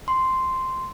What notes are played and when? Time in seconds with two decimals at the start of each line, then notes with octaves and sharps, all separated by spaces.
0.08 C6